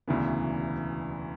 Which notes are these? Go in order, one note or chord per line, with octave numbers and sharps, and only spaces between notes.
E1 D2 C#3 E3 B3